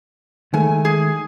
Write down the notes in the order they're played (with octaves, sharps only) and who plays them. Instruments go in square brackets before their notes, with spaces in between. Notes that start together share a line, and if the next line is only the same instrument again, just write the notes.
[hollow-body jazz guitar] D#3 G#3 A3 [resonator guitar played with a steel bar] G#5
[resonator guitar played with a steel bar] G#4